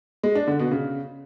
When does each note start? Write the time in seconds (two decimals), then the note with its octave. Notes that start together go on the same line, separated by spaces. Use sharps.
0.23 G#3
0.35 D4
0.47 D3
0.59 B2
0.71 C#3